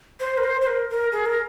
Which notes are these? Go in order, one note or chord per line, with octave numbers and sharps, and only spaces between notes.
C5
A#4
C5
C5
A#4
A#4
G#4
A#4